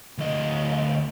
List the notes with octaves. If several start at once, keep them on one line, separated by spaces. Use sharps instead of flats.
D2 D#5